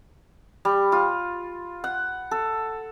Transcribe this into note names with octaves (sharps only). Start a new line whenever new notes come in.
G3
F4
F#5
A4